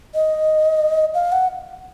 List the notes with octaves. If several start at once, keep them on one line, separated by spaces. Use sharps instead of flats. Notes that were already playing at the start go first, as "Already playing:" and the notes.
D#5
F5
F#5